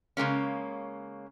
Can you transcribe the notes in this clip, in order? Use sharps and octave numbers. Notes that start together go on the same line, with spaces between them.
C#3 G#3 A#3 C#4